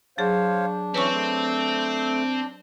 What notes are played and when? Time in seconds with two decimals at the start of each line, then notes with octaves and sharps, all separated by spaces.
0.18 F#3 D4 G#4 C5 C#5 F5
0.94 E3 C4 C#4 B4 C#5 C#6
1.11 A3